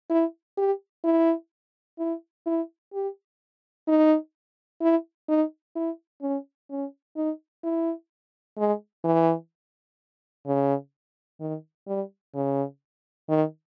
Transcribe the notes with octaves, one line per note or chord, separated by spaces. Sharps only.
E4
G4
E4
E4
E4
G4
D#4
E4
D#4
E4
C#4
C#4
D#4
E4
G#3
E3
C#3
D#3
G3
C#3
D#3